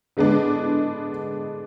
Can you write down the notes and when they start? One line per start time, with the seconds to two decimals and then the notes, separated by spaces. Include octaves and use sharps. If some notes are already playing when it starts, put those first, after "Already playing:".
0.17 D3 G#3 B3 D4